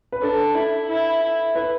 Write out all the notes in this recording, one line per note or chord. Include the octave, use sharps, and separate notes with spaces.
B4
D4 A4
E4
E4
E4
B4